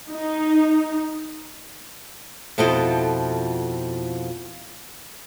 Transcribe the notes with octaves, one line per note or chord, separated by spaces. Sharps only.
D#4
F2 B2 F3 E4 A4 D#5